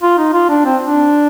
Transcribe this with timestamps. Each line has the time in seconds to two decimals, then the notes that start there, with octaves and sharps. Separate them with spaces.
0.03 F4
0.18 D#4
0.33 F4
0.49 D4
0.65 C4
0.82 D4